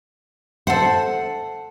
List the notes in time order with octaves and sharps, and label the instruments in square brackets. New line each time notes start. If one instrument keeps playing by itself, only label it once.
[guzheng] A4 C5 [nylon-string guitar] F#5